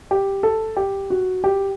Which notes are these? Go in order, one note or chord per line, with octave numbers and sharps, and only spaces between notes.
G4
A4
G4
F#4
G4